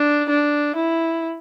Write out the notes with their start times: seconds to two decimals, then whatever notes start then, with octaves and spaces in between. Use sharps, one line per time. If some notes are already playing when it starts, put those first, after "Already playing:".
Already playing: D4
0.29 D4
0.76 E4